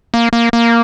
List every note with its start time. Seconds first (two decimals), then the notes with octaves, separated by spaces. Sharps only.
0.14 A#3
0.33 A#3
0.53 A#3